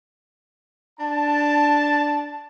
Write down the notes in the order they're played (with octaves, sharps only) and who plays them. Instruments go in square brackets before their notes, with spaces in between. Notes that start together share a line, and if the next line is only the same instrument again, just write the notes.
[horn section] D4 A5